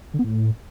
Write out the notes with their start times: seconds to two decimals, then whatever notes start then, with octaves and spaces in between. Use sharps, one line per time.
0.14 D3
0.19 B3
0.24 A2